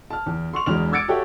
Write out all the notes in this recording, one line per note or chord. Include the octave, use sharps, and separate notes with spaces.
A5 F6
E2
C6 C#6 F7
E1 E2 F#3 G#3 F6 F7
D6 E6 G#6 A6 C#7 D7
F#4 G4 A4 C#5 E5 G5